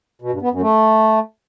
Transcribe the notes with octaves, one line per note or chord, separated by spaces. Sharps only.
B2
G2
B3
F#2
A3